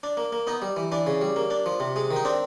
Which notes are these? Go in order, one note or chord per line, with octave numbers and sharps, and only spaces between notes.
D4
A#3
A#3
B3 D#4
G3
E3
E3 D4
C#3
G3
A#3
D4
F3
C3
G#3
D#3
D#4
C4 D4